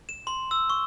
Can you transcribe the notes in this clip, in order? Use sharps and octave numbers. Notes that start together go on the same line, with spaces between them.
E7
C6
E6
C#6